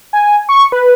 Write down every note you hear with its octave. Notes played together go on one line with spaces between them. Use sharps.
G#5
C#6
B4